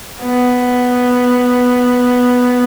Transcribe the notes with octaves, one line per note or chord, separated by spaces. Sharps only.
B3